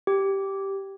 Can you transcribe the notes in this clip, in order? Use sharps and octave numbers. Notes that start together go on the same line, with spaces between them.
G4